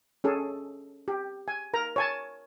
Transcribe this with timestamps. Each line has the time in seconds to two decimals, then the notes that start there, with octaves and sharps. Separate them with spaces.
0.24 C#4 G#4 A4
1.08 G4
1.48 G#5
1.74 A#4 A#5
1.96 C#5 G#5 A5